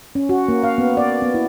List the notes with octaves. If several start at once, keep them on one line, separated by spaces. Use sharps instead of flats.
C#4
F#4
A#3
F5
B3
D5
B3
E4